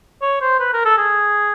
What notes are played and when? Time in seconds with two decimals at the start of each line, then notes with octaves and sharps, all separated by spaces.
0.22 C#5
0.41 C5
0.60 B4
0.73 A#4
0.85 A4
0.97 G#4